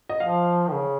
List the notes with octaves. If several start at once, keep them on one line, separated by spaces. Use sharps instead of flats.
D#5
F3 F5
D#3
C#3